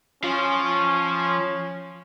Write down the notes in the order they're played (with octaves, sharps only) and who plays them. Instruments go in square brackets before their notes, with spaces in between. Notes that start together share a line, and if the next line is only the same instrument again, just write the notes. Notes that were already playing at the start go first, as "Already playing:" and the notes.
[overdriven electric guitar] F3 [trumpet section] C#4